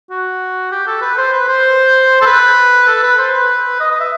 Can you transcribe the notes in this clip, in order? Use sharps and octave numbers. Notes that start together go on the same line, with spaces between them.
F#4
G4
A4
B4
C5
B4
C5
A4
B4
A4
B4
C5
B4
D#5
D#5
E5